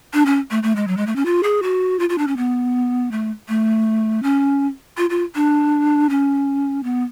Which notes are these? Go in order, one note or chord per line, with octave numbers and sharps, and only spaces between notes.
D4
C#4
A3
A3
G#3
F#3
G#3
A3
C#4
F4
G#4
F#4
F4
F4
D4
C#4
B3
A3
A3
C#4
F4
F4
D4
C#4
B3